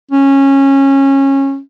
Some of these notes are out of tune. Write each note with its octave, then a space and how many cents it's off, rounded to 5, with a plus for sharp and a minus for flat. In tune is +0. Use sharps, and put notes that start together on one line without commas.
C#4 -20